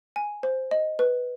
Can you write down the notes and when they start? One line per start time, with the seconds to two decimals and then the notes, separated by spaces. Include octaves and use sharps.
0.16 G#5
0.43 C5
0.71 D#5
0.99 B4